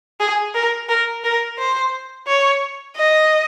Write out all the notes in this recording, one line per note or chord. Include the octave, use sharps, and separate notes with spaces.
G#4
A#4
A#4
A#4
C5
C#5
D#5